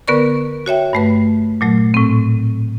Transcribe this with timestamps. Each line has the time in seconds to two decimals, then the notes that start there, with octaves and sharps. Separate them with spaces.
0.08 D3 B3 A#4 B4 D5 C#6
0.66 F#4 C#5 E5 G5
0.93 G2 A3 B4
1.61 A#2 F#3 A3
1.94 A2 C4